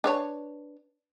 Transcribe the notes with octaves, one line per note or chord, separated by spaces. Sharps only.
D4 B4 C#5